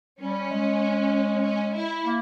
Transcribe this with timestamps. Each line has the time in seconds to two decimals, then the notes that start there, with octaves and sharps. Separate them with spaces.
0.20 G3 C#4
0.51 G#3
1.43 C#4
1.74 E4
2.05 A#3